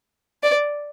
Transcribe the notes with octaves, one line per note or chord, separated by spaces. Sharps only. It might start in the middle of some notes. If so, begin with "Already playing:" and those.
D5